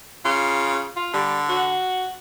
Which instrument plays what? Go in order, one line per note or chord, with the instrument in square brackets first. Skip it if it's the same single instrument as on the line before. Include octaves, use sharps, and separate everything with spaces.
[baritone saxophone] C#3 [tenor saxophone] F4
[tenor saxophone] F4
[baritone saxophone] D3 [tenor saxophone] G3
[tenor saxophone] F#4